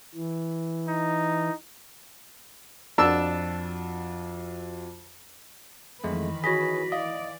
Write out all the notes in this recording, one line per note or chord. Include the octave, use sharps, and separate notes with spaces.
E3
D#4
F2 D4 F#4 A5 E6
F2 D#3 E3 G#3 A3 B4
F#4 G#4 C#5 A#6 B6
E3 D5 D#5 F5